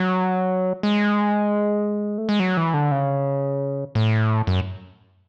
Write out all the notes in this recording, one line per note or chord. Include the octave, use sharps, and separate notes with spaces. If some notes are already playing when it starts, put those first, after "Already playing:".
Already playing: F#3
G#3
A3
G#3
F#3
E3
D3
C#3
A2
F#2